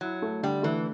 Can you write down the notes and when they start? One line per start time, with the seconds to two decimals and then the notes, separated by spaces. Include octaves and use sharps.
0.01 F#3 E4
0.22 A3
0.43 D3 G3
0.63 E3 A3